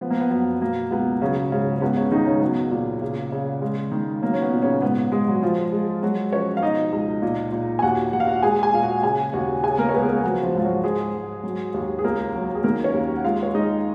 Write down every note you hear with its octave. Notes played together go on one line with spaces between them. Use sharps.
F3 B3
A#3
B3
F#2 B3
B2 A#3
C#2 B3
C#3 F#3 C#4
G#2 C#3 C#4
C#4
C#2 B3
C#3 C#4
C#2 D#3 D#4
C#3 C#4
F#3 B3
A#2
C#3
C#3
G#3
D#3
F#3 A#3
C#4
B3
A#2
C#3 C#4
G#2 B3
B3
G#3 G#4
F#3 F#4
F3 F4
G#3
F#3 G#3 F#4
F3 C#4 C#5
F5
B2 D#4 D#5
C#2
A#2
A#2
G#5
D#2 F#4 F#5
D#2 F#5
F5
F#4 F#5
G#3 G#4 G#5
G#4 G#5
A#2 F5
F#4 F#5
C#3 G#4 G#5
D#2 F#4 F#5
C#3 G#4 G#5
A#3 A#4
C#5
C#2 B3 B4
G#4
A#3 A#4
F3 F#3 F#4
F3 F4
G#2 F4
F#3 F#4
G#3 G#4
G#2
F#3
D#2
G#4
C#2 A#3 A#4
F#3
G#4
D#3 A#3 A#4
C#4 C#5
D#2
F#5
G#3 F4 F5
C#5
G#3 D#4 D#5